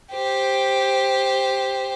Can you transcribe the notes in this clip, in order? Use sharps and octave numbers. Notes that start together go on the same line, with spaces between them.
G4 C5